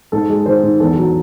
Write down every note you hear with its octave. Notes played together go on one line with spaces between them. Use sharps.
G#2 A4
G#3
D#3 C5
G#2
E2 A4
F#3